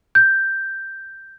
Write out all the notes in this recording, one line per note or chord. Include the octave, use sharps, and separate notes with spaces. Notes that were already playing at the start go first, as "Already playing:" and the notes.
G6